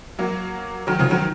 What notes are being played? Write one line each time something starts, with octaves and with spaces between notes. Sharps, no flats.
F#3 A#3
D#3 F#3
C#3 F3
D#3 F#3